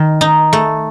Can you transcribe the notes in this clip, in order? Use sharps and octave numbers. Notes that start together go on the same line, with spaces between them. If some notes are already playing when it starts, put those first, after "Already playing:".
Already playing: D#3
D#4
A3